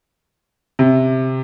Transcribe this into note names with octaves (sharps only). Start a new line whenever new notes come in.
C3